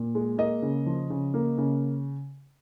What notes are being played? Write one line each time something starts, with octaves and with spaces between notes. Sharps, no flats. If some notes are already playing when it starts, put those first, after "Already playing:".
Already playing: A#2
G#3
A#3 D#5
C#3
F3
C#3
A#3
C#3